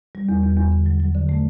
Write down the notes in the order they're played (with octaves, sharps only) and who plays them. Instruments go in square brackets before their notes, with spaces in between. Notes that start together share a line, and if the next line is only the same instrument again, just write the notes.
[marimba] G3
E2
E2
E2
D3
F#3
F#3
D3
A3